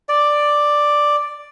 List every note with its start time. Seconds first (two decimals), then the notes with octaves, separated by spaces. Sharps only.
0.09 D5